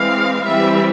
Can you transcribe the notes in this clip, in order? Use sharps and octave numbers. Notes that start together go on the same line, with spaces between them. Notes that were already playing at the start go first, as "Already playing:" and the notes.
Already playing: E3 G#3 C4 F5
E3 G3 C4 E5